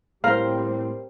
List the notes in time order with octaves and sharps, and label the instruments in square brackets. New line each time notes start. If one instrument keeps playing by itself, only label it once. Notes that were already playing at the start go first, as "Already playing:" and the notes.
[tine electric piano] A2 [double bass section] G3 C4 [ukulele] A#4 C5 [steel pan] F5